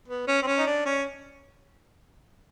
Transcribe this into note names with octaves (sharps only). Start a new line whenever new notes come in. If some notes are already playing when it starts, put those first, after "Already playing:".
B3
C#4
C4
C#4
D#4
D4
C#4